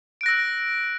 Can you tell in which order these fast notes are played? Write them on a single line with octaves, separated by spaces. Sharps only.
D7 F#6 A#6 E6